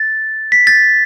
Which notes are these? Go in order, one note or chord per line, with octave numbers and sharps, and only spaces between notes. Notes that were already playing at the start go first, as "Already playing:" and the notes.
Already playing: A6
B6
A6